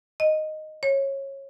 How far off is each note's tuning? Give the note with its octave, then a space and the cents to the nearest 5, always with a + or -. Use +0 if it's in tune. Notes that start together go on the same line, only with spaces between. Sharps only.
D#5 -5
C#5 -20